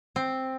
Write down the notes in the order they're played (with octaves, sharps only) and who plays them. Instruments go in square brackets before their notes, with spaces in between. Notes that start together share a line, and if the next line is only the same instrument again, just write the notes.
[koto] C4